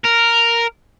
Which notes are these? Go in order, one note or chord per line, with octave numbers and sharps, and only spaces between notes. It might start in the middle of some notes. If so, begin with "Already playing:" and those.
A#4